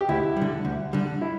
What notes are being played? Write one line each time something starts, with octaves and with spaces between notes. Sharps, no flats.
G4
D2 E4
D3 G3
D2
D3 G3
E4